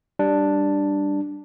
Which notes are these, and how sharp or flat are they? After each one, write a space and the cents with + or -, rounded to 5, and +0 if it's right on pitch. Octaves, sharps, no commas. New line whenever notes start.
G3 +0 D4 +0